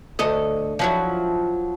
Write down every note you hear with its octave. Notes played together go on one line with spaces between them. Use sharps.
D2 A4 D#5
F3 F#3 E4